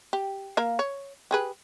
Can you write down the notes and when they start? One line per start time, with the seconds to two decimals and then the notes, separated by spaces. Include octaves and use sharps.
0.13 G4
0.57 A#3 A#4 F5
0.79 C#5
1.31 G4 G#4 B4